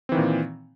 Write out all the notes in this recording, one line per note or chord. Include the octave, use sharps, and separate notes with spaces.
A#2 D#3 E3 C4